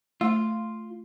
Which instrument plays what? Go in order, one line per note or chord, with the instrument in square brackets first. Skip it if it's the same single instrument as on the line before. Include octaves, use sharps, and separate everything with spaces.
[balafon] A3 [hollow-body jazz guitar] F4